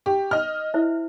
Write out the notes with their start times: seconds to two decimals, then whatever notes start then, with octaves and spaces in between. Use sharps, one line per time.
0.06 G4 C#6
0.31 D#5 F6
0.74 E4 C5 E5